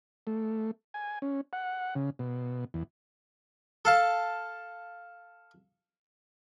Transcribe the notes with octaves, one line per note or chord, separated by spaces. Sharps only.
A3
G#5
C#4
F#5
C#3
B2
E2
A4 F5 A5